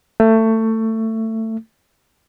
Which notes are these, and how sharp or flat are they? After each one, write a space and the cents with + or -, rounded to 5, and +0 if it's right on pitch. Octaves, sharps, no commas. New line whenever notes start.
A3 +20